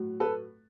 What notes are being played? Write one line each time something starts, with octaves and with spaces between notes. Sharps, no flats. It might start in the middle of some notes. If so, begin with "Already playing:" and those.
Already playing: A2 F#3
A4 B4